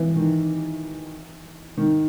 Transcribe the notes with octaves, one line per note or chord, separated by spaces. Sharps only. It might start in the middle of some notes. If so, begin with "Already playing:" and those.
Already playing: E3
D#3
D#3